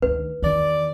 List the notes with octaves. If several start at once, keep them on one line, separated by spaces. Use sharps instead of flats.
D2 D#3 B4
E2 D#3 D5